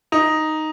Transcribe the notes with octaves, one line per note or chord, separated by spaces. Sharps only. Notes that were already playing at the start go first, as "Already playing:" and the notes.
D#4